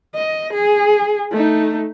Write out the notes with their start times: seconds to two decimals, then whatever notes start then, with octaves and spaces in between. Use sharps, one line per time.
0.15 D#5
0.53 G#4
1.32 A3 D#4